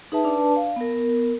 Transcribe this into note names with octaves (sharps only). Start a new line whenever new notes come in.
D#4 G#4 B4 E5 A5
D4 B4 D5 A5
F5
B3 A#4